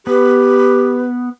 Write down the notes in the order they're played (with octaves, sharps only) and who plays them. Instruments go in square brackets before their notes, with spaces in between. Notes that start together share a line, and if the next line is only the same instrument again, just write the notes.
[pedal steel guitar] B3 [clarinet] G4 [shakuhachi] B4